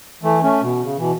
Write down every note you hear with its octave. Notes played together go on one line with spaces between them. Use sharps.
E3 A3
A3 C#4
B2
C#3
B2 E3